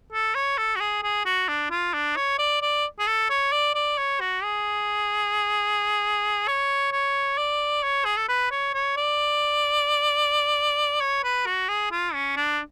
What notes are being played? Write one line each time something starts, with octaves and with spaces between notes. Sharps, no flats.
A4
C#5
A4
F#4
G#4
G#4
F#4
D4
F4
D4
C#5
D5
D5
G#4
A4
C#5
D5
D5
C#5
F#4
G#4
C#5
C#5
D5
C#5
G#4
A4
B4
C#5
C#5
D5
C#5
B4
F#4
G#4
F4
C#4
D4